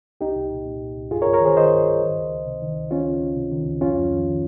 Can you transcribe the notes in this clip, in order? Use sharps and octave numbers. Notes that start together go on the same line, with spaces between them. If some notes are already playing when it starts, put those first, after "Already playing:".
C2 D#4 G4
C2
A#2
A#2
C2
C2
G2 F4 G#4
A#4 C#5
G2
A#4 C#5
D#3 G#4 C5
D#3 C5 D#5
G2
G2
D#3
C#2
C#2
C3
D#3
C#2
D#3 C#4 F4
C#2
C#2
C3
D#3
C#2
F2 C#4 F4
F2
D#3
D#3